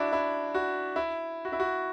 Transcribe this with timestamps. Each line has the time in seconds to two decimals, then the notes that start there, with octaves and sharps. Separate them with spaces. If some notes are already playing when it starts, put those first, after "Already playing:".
Already playing: D4 E4 F#4
0.12 E4
0.55 F#4
0.96 E4
1.45 F#4
1.52 E4
1.60 F#4